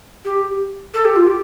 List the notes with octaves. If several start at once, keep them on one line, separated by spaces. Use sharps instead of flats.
G4
A4
G4
F4
G4